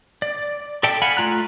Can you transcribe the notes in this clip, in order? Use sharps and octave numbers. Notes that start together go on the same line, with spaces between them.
D5
A4 D5 E5 G5 A5
F5 F#5 G#5 B5
A3 F4 A#5 F#6